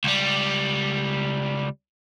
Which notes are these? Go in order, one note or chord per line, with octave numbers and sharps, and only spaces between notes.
C#2 G3